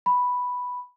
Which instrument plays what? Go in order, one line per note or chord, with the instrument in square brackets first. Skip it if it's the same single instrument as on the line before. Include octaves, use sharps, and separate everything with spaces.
[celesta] B5